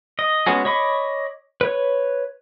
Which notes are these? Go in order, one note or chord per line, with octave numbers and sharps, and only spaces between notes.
D#5
G#3 B3 C#4 F#4 G#4
C#5 D#5 B5 C#6 D6
B4 C#5